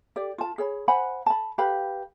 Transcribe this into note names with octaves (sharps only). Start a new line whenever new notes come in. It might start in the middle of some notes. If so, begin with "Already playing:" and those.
G4 D5
F4 A5
G#4 C#5 B5
C5 F#5 G#5 B5
A5 B5
G4 B4 F5 B5